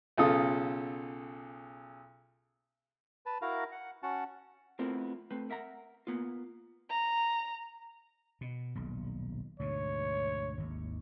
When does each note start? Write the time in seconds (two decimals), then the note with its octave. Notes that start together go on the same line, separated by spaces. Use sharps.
0.17 B1 C#3 F4 A4 D#6
3.26 B4 A5
3.42 E4 F#4 A#4 F5 A#5
3.72 F#5
4.03 C#4 F#4 F#5 A5
4.79 A3 B3 C4 E4 F4 A#4
5.31 A3 C4 B4
5.50 A#4 E5 F#5 A#5
6.07 A#3 B3 F4
6.91 A#5
8.41 B2
8.75 D#1 B1
9.60 D2 G#2 B2 C#5
10.58 G#1 D#2